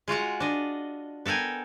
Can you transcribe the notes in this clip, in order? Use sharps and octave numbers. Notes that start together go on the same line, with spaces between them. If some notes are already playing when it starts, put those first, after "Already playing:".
G#3 F4 F#4 F#5
D4 D#5
B3 A4 A#4 G5 G#5